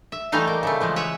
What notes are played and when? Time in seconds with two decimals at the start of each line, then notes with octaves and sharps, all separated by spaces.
0.12 E5
0.32 E3 G3 A3 D#4 F5
0.47 A#3
0.63 C#3 G3 A3
0.81 E3 F3 G#3
0.96 B4 C#5 E5